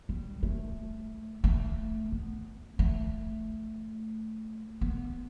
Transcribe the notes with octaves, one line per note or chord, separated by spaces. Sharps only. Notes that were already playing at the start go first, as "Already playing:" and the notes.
G3
A3
A3
B3
A3
B3